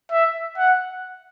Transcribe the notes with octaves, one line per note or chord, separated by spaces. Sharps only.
E5
F#5